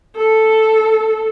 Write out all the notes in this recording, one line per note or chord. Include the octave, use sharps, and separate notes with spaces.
A4